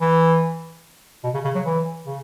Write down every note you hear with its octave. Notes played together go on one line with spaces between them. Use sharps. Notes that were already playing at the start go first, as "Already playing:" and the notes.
E3
B2
C#3
C#3
F#3
E3
C#3